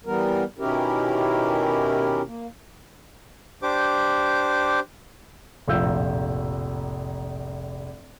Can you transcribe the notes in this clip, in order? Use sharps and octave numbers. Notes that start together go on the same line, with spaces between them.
E3 G3 B3 A#4
B2 D#3 C#4 E4 G4 A#4
A#3
D4 G4 C5 D6
F1 A#1 A2 F4 E6 G6